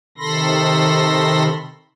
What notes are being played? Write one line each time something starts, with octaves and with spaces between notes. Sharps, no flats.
C3 D#3 A4 B5 C6 A#6